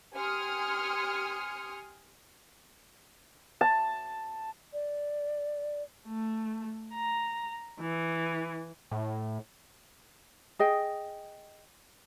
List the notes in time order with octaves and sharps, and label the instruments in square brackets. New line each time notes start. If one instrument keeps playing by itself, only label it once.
[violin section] G4 G#5 C6 D#6 F6 C#7
[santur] A5
[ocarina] D5
[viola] A3
A#5
E3
[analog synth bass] A2
[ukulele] G#4 D#5 G5